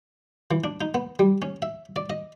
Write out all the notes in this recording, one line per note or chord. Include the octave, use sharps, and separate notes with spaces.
E3
D4
D#4
B3
G3
C#4
E5
D5
D#5